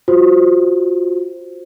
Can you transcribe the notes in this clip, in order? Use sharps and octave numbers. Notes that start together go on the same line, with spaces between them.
F4 F#4 C5